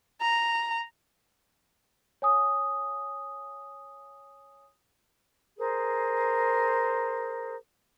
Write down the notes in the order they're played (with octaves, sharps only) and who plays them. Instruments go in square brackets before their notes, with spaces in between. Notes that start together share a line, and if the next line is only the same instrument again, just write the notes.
[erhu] A#5
[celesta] C#5 G#5 D#6
[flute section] G#4 A#4 C5